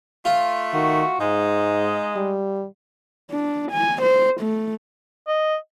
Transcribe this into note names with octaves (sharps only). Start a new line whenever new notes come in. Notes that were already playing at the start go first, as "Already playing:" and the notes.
A3 F4
D#3 F#4
G#2 G#3 D#4
G3
D4
G#5
C5
A3
D#5